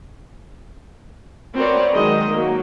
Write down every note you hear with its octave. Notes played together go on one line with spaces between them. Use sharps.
C4 F#4 A#4 B4 C#5 D5
D#3 F#3 G#3 D#5
F#3 A#3